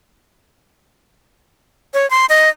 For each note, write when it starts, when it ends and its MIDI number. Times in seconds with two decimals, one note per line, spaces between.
1.94 2.09 73
2.10 2.26 84
2.29 2.49 75